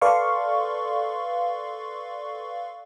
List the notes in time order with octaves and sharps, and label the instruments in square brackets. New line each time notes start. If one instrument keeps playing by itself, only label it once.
[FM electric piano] A4 B4 D5 F5 C6 C#6